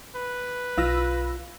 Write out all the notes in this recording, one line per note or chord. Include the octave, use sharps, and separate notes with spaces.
B4
B1 F4 E6 A#6